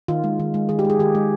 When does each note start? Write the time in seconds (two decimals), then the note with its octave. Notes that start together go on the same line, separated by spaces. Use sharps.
0.08 D#3 F4
0.24 G#3
0.40 D#3
0.54 G#3
0.69 D#3 G#4
0.79 G4
0.85 G#3
0.90 G#4
0.99 D#3 G4
1.15 G#3